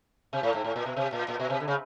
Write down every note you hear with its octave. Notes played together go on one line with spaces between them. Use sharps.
C3
A2
G#2
A2
A#2
B2
C3
A#2
A#2
B2
C3
D3
C#3